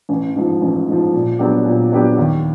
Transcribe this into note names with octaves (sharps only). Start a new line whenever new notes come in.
A1
G#2 F3
A1
G#2 F3
A#2
F#3 B3 D4 G4
A#2
F#3 B3 D4 G4
D#2